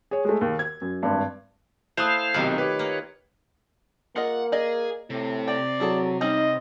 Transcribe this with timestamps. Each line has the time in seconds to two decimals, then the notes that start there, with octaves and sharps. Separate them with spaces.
0.11 G#4 C#5
0.25 G#3 A3
0.41 D#2
0.59 G#6
0.81 F#2
1.03 G#1 G2
1.97 A3 E4 C5 F5 D#6 F#6 G6
2.34 B1 C3 D#3 F4
2.58 G4 B4 C#5
2.79 A#3
4.16 A#3 F4 G#4 D#5 F#5
4.52 G#4 D5 D#5
5.10 A2 C3
5.48 D5 G5
5.80 F#3 E4 G#4 A4
6.21 G3 C4 C#4 D#4 D#5